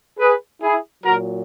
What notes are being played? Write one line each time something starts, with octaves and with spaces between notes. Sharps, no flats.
G#4 B4
E4 G#4
A#2 F#3 F#4 A#4